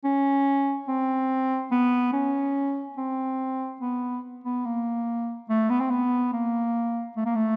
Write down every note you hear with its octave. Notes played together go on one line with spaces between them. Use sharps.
C#4
C4
B3
C#4
C4
B3
B3
A#3
A3
B3
C4
B3
A#3
A3
A#3
A3